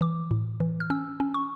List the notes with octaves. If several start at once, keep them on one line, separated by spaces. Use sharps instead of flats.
E3 D6
A2
E3
F6
C#4 E6
C#4
C#6